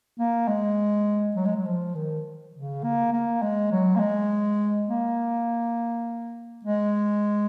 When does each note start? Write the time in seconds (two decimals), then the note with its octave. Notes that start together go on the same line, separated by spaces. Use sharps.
0.19 A#3
0.48 G#3
1.36 F#3
1.45 G#3
1.56 F#3
1.66 F3
1.95 D#3
2.54 C#3
2.83 A#3
3.12 A#3
3.42 G#3
3.72 F#3
3.96 A#3
4.00 G#3
4.89 A#3
6.65 G#3